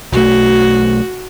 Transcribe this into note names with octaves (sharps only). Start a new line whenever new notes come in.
B1 A3 F#4